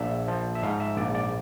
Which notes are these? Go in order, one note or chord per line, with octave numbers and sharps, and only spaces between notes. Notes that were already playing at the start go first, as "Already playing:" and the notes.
Already playing: A#1 E5
F3
E5
G#2 F5
E5
A#1 D5
D5